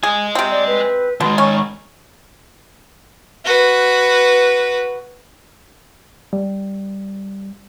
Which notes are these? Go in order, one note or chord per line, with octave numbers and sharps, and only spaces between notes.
G#4 D#5 G#5
C3 C4
D5
B4
B2 D#3 G#3 C6
C#4 C#6
F#4 B4
G3